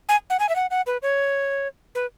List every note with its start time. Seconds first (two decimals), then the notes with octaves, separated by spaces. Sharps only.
0.09 G#5
0.30 F#5
0.39 G#5
0.49 E5
0.56 F#5
0.71 F#5
0.86 B4
1.02 C#5
1.95 B4